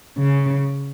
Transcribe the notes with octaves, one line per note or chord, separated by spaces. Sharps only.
C#3